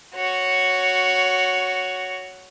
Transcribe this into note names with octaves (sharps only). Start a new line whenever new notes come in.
F#4 C#5